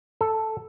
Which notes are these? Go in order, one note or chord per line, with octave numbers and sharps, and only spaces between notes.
A4